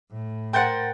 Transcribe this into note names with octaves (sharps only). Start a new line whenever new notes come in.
A2
A#4 C5 F#5 G5 G6 A6